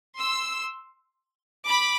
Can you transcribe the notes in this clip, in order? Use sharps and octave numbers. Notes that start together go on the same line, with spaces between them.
C6 E6
B5 D6